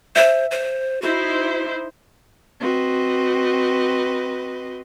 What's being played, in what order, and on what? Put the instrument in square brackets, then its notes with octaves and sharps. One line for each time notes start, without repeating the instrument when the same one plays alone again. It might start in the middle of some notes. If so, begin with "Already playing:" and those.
[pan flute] C5 [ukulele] E5
[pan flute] C5
[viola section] D#4 E4 C5 [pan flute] F#4
[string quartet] C4 F#4 B4 D#5